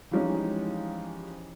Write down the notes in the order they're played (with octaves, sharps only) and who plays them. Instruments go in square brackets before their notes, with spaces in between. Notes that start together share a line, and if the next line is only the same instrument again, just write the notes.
[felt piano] E3 F3 G3 G#3 C#4 D#4